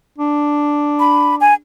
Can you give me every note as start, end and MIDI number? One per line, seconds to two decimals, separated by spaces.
0.18 1.60 62
1.00 1.36 83
1.41 1.54 80